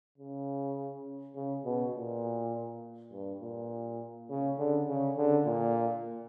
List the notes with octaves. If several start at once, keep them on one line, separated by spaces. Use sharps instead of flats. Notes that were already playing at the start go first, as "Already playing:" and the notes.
C#3
C#3
B2
A#2
G2
A#2
C#3
D3
C#3
D3
A#2